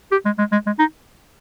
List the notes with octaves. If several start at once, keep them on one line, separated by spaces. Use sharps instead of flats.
G4
G#3
G#3
G#3
G#3
D#4